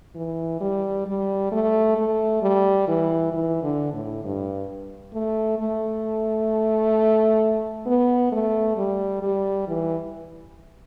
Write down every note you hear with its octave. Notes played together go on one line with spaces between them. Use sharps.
E3
G3
G3
A3
A3
G3
E3
E3
D3
A2
G2
A3
A3
B3
A3
G3
G3
E3